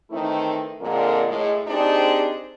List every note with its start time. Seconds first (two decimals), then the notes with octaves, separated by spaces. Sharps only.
0.10 D#3 E3 A3 C4 D#4 E4
0.81 F2 A#2 D3 G#3 A#4
1.27 A2 G#3
1.67 C4 D4 D#4 G4 G#4 C5